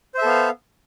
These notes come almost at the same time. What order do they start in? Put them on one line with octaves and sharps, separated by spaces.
C5 E5 A4 B3 F5